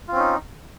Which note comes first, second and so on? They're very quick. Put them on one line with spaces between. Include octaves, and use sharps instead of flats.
F4 C4 C#4 D#4